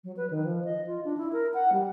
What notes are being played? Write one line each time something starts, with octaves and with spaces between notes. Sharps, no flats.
F#3
B4
D#3
F3
D#5
F4
D4
E4
A#4
F#5
G3